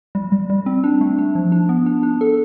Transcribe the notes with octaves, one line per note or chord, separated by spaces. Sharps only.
G3
G3
G3
C4
D4
A3
D4
F3
D4
B3
D4
D4
A4